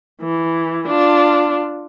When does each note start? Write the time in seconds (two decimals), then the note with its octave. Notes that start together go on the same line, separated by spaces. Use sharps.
0.22 E3
0.88 D4 F4